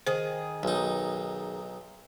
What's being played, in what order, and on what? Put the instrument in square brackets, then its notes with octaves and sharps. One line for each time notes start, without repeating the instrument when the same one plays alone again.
[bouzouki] D#3 G#4 [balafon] C5
[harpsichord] B1 D#4